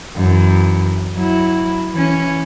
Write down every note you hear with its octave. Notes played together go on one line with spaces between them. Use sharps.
F#2 E3
F#3 E4
E3 C#4